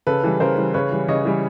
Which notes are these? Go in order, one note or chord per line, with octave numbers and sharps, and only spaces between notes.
C#3 A4 B4
E3 G3
C#3 A#4 C5
E3 G3
C#3 B4 C#5
E3 G3
C#3 C#5 D#5
E3 G3